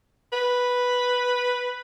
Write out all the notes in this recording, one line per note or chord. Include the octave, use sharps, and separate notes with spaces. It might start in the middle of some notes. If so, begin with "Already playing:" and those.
B4